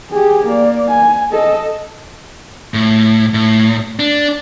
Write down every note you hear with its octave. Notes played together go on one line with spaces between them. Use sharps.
G4 G#4
A#3 D5
G#5
A4 D#5
A2
A2
D4